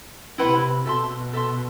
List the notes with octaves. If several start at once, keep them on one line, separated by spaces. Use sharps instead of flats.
C3 E4 B4 F#5 C6
B2 A4 E5 A5 C6
A4 E5 A5 C6